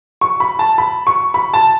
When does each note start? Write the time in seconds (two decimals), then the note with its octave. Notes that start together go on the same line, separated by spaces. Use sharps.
0.21 C#6
0.40 B5
0.59 A5
0.78 B5
1.07 C#6
1.34 B5
1.54 A5